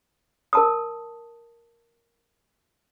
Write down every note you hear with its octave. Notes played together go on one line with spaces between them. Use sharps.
A#4 A5 D#6